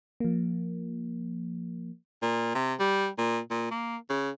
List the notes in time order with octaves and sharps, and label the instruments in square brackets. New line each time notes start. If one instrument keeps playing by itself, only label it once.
[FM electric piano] F3 A#3
[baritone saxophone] A#2
C3
G3
A#2
A#2
A#3
C#3